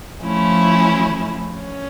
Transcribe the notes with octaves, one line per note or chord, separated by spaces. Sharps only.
F3 A3 C#4 E4
C#4